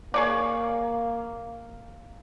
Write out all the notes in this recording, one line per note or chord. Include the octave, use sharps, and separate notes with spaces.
A#3 G#4 C#5 D5